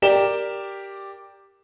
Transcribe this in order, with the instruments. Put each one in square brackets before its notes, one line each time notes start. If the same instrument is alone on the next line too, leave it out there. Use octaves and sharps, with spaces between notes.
[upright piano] G4 A#4 D5 E7 G7